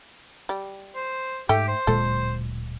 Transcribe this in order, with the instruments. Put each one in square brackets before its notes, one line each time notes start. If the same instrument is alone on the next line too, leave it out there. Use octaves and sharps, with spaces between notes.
[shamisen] G3
[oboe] C5
[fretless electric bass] G#2 [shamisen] A3 G5 [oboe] G4
[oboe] C5
[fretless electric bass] D1 A#2 G#3 [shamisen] A4